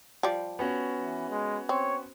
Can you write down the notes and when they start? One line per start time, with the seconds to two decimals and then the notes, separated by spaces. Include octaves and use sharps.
0.23 F3 G3 D5
0.59 B3 C#4 F#4
1.00 E3
1.30 G#3
1.69 C4 C#5